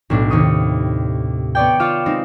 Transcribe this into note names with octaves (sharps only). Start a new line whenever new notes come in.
B1 A2 D4
D#2 A2 C3 C#6 D#6
B3 C#5 D5 G5
F4 C#5 F5 D6 E7
G#3 C4 D#4